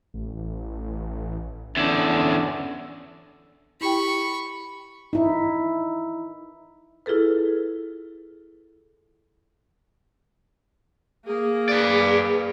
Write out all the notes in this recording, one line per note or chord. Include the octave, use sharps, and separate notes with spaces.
A1
E2 D3 C#4 D4
E4 G4 G5 B5 C#6
D#4 E4
E4 F4 G#4 A4 B4
A#3 G#4
B4 D5